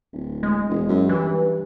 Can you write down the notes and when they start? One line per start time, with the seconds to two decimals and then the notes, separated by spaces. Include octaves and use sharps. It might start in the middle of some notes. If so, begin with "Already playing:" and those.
0.13 D1
0.43 G#3
0.69 E1
0.88 F#2
1.09 G2 E3